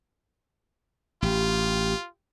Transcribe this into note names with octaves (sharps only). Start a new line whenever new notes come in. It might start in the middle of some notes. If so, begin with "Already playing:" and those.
A1 F4 G4